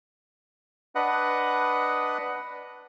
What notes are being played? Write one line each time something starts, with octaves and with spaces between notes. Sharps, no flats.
D4 B4 D#5 F#5